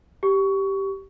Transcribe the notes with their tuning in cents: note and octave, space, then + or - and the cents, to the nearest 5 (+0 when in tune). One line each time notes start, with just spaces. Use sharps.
G4 -5 C#6 +20